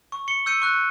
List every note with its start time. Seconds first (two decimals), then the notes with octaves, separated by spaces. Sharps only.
0.12 C#6
0.28 C#7 G7
0.46 E6 G6 C#7 D#7
0.62 C#6 F#6